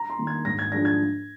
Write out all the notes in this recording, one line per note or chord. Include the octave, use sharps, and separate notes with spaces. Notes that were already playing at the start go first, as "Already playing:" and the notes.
Already playing: A#5
C6
D#3 A#3
G#6
G#2 A#6
G#6
F3 G#3 D4 A#6
G#6